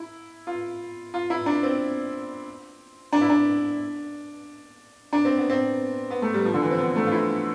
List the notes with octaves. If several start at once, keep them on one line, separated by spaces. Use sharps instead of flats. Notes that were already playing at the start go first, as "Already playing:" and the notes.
Already playing: E4
F4
F4
E4
D4
C4
D4
E4
D4
D4
C4
B3
C4
B3
A3
G3
F3
D3
E3
C4
B3
A3
F4
E4